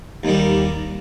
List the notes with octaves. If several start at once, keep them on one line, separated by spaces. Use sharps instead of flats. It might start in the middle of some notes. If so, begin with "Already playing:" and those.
D#2 D#3 G3